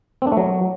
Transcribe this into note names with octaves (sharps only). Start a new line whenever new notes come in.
C4
D4
A3
F#3